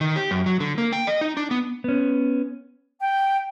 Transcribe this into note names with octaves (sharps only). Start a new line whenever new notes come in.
D#3
G4
F#2
F#3
D3
A#3
G5
D#5
D#4
D4
B3
B3 C#4
G5